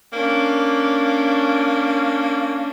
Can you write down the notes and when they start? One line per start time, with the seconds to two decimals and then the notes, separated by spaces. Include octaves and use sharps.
0.13 A#3 C#4 D4